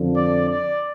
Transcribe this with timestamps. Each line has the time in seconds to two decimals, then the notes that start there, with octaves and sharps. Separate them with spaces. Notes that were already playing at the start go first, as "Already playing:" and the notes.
Already playing: F2 D3 F3
0.14 D5
0.49 D5